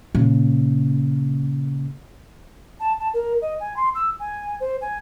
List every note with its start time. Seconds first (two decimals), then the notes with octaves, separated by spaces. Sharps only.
0.15 A#2 C#3
2.79 A5
2.99 A5
3.13 A#4
3.41 D#5
3.60 G#5
3.76 C6
3.94 E6
4.19 G#5
4.60 C5
4.81 G#5